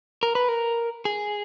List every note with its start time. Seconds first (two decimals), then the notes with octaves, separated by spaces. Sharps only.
0.23 A#4
0.35 B4
0.48 A#4
1.05 G#4